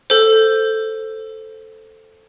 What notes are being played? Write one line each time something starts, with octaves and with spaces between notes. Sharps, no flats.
A4 C5